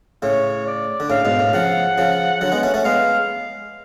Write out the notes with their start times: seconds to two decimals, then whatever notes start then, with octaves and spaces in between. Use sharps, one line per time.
0.22 A2 C#3 C#5
0.67 D5
1.00 D3
1.10 A2 C#3 F5
1.25 G#2 B2
1.39 A2
1.53 C#3 F3 F#5
1.98 C#3 F3
2.41 D3 F#3
2.52 G#3 B3
2.63 A3 C#4
2.74 A3 C#4
2.85 G#3 B3 F5